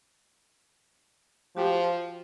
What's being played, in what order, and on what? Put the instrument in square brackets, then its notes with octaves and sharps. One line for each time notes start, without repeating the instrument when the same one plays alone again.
[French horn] F3 [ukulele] F#4 G4